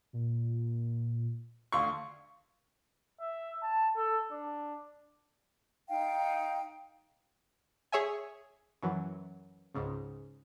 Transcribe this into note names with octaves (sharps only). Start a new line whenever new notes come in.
A#2
D2 F5 C6 C#6
E5
A5
A4
D4
D#4 F5 G5
G#4 C#5 E5 G#5
F#2 E3 F#3
C#2 G#2 C#3